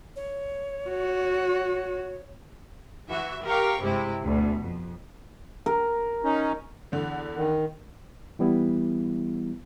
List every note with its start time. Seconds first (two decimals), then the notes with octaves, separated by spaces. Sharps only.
0.16 C#5
0.90 F#4
3.09 E3 F#4 E5
3.43 G4 A#4 F5 G5 C#6
3.80 G2 C3 G#3 E4 G4
4.23 D2 B2
4.59 F2
5.66 A#4
6.24 C#4 D#4
6.92 E2 D3
7.35 D#3
8.39 E3 G3 B3 E4